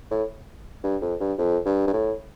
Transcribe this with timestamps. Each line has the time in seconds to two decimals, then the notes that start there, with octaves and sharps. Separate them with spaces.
0.11 A2
0.84 G2
1.02 F2
1.20 G2
1.38 F2
1.66 G2
1.87 G2
1.93 A2